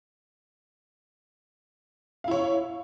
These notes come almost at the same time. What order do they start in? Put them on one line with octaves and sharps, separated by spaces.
F5 E4 C#5